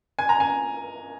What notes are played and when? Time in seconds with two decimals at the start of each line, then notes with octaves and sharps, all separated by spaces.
0.19 G#5
0.29 A#5
0.40 G#5